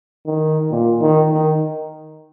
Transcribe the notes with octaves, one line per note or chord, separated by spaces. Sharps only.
D#3
A#2
D#3
D#3